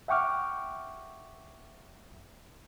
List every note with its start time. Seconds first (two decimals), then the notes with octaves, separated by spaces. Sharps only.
0.08 E5 F#5 G5 C#6 D6 F6